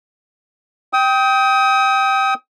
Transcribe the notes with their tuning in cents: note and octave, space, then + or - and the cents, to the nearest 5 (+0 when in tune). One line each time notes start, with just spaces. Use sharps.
G5 -5 D#6 +30